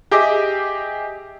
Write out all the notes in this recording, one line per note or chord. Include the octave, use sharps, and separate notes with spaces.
G4 G#4 D#5 E5 D6